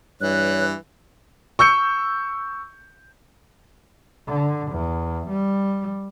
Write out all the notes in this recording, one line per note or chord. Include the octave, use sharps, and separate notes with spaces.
G2 E3 C#5 F#6
C#6 E6 G6 C#7
D3
E2
G3